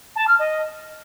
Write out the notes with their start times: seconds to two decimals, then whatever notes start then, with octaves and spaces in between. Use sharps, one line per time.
0.16 A5
0.27 F6
0.39 D#5